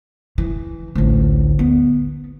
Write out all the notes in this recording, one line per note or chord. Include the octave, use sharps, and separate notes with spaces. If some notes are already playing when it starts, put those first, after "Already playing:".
E3
A1 D2
B3